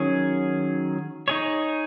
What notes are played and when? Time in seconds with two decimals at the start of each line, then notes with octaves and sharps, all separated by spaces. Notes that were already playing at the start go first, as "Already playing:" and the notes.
Already playing: D#3 F#3 C#4 G#4
1.28 D#4 G#4 C#5